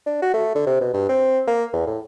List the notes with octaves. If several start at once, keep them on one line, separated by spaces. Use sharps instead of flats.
D4
F#4
A3
D3
C3
B2
G2
C4
A#3
E2
A2